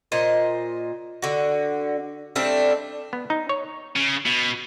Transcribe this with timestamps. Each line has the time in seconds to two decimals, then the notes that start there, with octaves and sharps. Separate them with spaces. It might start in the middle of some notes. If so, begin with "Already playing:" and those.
0.12 A#2 C5 D#5
1.22 D3 F#4
2.35 G3 A3 C4 D4
3.13 B3
3.30 D#4
3.49 C#5
3.96 C#3
4.26 B2